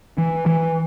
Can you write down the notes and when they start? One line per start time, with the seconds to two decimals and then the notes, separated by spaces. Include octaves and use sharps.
0.18 E3
0.46 E3